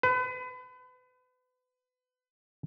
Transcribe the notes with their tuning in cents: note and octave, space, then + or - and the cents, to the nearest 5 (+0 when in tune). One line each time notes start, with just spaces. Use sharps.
B4 +35